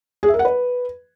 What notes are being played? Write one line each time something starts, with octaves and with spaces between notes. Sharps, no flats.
G#4
E5
A#4
F#5
B4